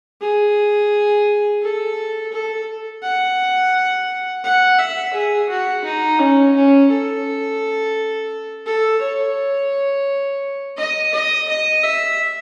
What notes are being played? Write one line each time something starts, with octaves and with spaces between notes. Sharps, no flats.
G#4
A4
A4
F#5
F#5
E5
G#4
F#4
D#4
C#4
C#4
A4
A4
C#5
D#5
D#5
D#5
E5